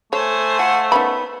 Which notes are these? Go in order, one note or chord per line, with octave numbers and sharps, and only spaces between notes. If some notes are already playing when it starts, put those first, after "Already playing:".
A3 A4 C5 C#5 G#5
F3 F#5
D#3 B3 C#4 B5